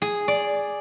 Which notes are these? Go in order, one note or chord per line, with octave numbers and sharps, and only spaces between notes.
G#4
D5